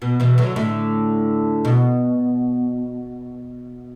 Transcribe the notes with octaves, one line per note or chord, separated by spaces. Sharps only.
B2
B2 E3
D3 F#3
A2 D3
B2